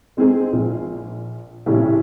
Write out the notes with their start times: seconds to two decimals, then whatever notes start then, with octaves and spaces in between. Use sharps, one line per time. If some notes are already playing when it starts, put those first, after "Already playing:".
0.17 G#3 C4 D#4 G#4
0.52 A#1 F4
1.66 A#1 A2 C#3 G4